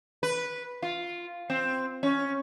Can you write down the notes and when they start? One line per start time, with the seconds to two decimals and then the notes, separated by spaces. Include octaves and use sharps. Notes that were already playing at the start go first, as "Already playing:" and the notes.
0.23 B4
0.82 F4
1.50 C4
2.03 C#4